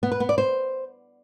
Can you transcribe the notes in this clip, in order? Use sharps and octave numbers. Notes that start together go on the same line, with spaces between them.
B3
B4
B3
D5
C5